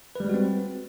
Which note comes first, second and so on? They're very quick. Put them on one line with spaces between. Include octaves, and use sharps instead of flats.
B4 G3 G#3 F#4 C4